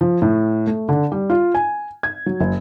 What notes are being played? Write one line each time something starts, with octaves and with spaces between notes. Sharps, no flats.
F3
A2
A3
D3
G3
F4
G#5
G#6
F#3
F#1